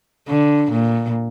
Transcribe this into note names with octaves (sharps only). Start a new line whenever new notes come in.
D3
A#2